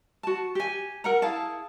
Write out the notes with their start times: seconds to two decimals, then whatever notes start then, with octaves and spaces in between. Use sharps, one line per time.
0.23 F#4 A5
0.55 G4 G#5
1.04 A#4 F#5 A#5
1.22 E4 G#4 F5 A5